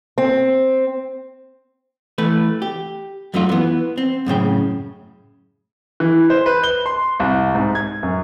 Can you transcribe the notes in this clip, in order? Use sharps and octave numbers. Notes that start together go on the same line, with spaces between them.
C4
E3 A3 B4
G4
F#2 F#3 A3 D#4 F4
E3 B3
C4
F#2 A2 C#3 G5
E3
C5
B4
G7
C6
C2
G#2
G#6
F#2